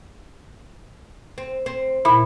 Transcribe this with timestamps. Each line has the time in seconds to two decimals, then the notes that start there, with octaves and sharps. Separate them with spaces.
1.38 C4
1.66 C4
2.05 A#2 E4 B5